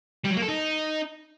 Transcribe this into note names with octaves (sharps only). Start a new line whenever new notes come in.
G3
F#3
A#3
A4
D#4